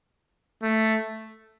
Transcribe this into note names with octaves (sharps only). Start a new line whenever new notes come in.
A3